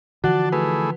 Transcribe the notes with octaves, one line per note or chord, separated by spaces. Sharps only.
D3 E3 F3 F#4 D5 F#5 A5
A3 E4 G#4 B4